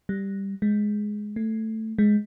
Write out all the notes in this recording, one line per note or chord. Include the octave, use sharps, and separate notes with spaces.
G3
G#3
A3
G#3